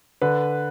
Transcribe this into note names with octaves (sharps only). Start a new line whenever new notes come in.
D3 B4